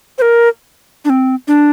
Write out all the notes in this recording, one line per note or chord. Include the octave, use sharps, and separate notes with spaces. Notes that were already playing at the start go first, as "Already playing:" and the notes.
C5
A#4
D4
C4
D4